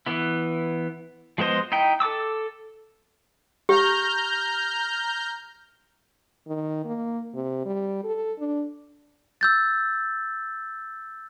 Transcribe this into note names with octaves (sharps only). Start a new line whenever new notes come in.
E3 B3 E4
F3 G#3 B3 C5 D#5
D#4 E4 G5
A4 A5 D6 E6
G4 A#5 F6 G6
D#3
A#3
C3
G3
A4
D4
E6 G6 A6